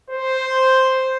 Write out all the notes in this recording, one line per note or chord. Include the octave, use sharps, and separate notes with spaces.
C5